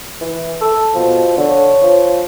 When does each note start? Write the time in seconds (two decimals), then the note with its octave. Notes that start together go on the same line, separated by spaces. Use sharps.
0.21 E3
0.61 A4
0.95 B2 F3
1.38 D3 C#5
1.82 F3